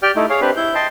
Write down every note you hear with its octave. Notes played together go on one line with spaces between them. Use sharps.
G4 D5 G5 F6
A3 D#4 E4
G#4 C#5 F5
C4 D4 G4 B4
E4 G6
D#5 G5 A5 C6